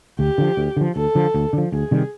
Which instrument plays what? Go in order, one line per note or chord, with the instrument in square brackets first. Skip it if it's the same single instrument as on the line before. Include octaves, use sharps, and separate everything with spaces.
[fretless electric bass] D2 [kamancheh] G4
[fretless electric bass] D3 F3
D2
D3 F3
[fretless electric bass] D2 [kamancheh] A4
[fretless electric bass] D3 F3
D2
D3 F3
[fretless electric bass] D2 [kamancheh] G#4
[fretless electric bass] C3 D#3 G3